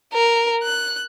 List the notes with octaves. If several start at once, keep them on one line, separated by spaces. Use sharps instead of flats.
A#4
F#6